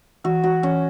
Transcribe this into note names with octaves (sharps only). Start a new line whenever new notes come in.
E3 F#4
E3 F#4
E3 C#4